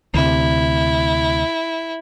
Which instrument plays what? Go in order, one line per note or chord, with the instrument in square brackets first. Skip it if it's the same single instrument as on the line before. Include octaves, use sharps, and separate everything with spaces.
[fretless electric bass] D2 C3 [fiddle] E4